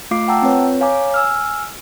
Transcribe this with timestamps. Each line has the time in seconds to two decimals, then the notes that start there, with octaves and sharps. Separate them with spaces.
0.11 A3 F4 F5 D6 C7
0.28 F#5 G5 A5 A#5 E6
0.42 C4 F4 B4 C#5
0.81 C#5 F5 G#5 A#5 D6
1.14 G#5 E6 F6